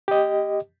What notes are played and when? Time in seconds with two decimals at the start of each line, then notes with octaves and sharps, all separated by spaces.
0.08 G4 D#5